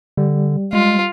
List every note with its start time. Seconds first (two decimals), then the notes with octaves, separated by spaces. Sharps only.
0.17 D3 G3
0.73 G#3 F4